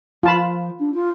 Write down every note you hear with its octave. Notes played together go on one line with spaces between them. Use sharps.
F3 F4 A5 B5
D4
F4